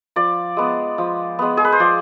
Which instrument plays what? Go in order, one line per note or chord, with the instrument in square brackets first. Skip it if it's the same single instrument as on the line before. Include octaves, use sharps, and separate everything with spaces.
[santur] F3 D5
G#3 B3
F3
G#3 B3
G#4
B4
C5
F3 D5